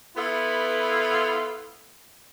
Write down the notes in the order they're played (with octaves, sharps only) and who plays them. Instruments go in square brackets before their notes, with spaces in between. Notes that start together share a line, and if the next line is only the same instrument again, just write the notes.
[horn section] B3 E4 F4 A4 B4